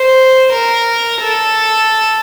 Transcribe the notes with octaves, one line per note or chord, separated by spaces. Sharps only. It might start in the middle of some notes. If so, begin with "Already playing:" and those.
Already playing: C5
A#4
A4